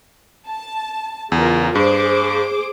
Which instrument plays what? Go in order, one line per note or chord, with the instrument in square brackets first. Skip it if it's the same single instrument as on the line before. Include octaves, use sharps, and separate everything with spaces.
[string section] A5
[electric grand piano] E2 [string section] C#3 F4 A#4
[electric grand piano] G2 [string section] G#4 C5 D6